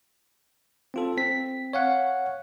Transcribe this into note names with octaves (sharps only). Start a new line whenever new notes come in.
C4 F4 A4
C4 B6
C#5 F5 F#5